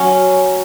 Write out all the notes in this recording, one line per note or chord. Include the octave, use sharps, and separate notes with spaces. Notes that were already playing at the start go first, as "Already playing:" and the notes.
Already playing: F#3 C#4